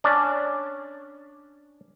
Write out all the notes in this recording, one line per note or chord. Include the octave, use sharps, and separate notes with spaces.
C#4 D4 D5